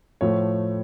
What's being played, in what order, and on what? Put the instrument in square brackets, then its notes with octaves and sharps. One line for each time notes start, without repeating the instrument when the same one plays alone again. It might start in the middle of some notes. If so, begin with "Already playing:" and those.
[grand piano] A2 F3 A3 C#5